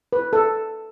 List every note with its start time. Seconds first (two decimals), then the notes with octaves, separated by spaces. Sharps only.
0.13 B4
0.33 A4